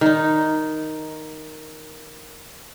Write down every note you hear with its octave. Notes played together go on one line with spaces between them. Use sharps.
D#3 D#4